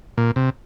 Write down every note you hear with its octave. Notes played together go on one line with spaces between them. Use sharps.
A#2
C3